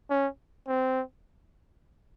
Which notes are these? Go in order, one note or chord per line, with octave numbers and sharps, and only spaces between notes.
C#4
C4